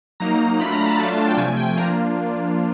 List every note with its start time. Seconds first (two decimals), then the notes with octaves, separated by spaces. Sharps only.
0.20 F#3 A#3 D#4 A#5
0.60 F#3 A3 D4 F4 B5
0.72 A#5
0.86 A5
0.99 F#3 A3 D4 F4
1.29 G5
1.37 C3 F3 A3 G#5
1.47 G#5
1.57 G5
1.77 F3 A#3 D4 F4 A#5